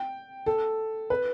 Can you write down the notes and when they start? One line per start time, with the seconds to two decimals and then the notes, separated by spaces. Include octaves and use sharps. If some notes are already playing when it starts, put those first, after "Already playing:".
Already playing: G5
0.46 A4
1.10 B4